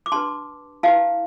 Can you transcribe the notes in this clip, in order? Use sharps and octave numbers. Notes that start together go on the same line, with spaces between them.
D6
D4 G4 B4 A5 C6
E4 G4 B4 F5 A5